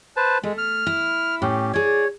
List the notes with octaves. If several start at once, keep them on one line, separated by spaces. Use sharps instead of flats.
B4 C5 A5
G#3 A3
F6
E4
A2 C#4 G4
G#4 C#5 D5